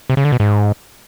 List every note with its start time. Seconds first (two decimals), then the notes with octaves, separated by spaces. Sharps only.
0.10 C3
0.17 C#3
0.25 D3
0.32 B2
0.40 G#2